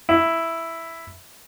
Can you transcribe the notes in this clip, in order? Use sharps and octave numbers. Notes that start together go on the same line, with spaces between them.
E4